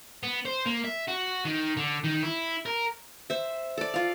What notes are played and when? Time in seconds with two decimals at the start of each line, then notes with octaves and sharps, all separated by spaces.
0.23 B3
0.45 C5
0.66 A#3
0.84 E5
1.08 F#4
1.45 D#3
1.77 D3
2.04 D#3
2.23 E4
2.66 A#4
3.30 C5 E5
3.78 A4 D5
3.94 F4 F5